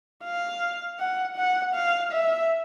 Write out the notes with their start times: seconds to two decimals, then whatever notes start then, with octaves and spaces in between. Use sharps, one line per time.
0.24 F5
0.99 F#5
1.37 F#5
1.75 F5
2.12 E5